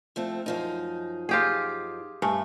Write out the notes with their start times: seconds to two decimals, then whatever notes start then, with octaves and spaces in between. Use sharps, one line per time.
0.16 F3 A3 C4
0.46 F#2 F3 D#4
1.29 F4 G4 G#4
2.22 G2 A3 G#5 A5